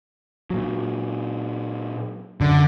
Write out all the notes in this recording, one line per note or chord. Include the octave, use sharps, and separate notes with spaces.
A#2 F#3
F#2 D3